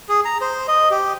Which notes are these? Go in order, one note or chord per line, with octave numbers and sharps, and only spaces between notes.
G#4
A#5
C5
D#5
G4